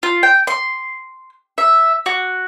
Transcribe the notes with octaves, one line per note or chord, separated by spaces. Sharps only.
F4
G5
C6
E5
F#4